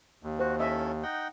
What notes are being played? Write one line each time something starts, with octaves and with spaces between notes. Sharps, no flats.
D#2
F#4 C5
C#4 E4 A4 D#5 E5 A5
D#4 F#5 G5